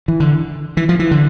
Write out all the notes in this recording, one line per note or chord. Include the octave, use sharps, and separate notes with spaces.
E3
D3
E3
F3
E3
D3